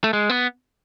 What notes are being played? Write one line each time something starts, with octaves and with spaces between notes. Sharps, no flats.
A3
G#3
B3